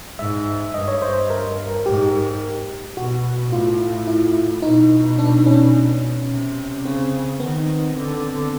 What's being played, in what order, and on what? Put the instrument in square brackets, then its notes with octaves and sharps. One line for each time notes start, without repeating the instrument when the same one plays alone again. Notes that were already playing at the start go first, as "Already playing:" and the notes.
[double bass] G#2 [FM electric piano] E5
[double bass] G2 [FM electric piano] D#5
[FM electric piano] C#5
C5
A#4
[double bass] G#2 [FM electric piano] G4
[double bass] B2 [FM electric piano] F#4
[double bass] A2 [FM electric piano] F4
[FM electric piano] E4
[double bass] B2 [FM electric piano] D#4
[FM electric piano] D4
C#4
[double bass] C3
[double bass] C#3 [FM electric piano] C4
[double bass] D#3 [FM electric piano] B3
[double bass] D3